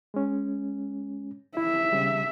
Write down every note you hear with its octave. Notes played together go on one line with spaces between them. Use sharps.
G#3 C#4
E4 E5
C#3 G3